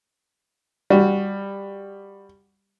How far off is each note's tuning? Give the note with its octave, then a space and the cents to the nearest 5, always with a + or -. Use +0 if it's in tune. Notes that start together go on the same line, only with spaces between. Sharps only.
G3 +10 F#4 +0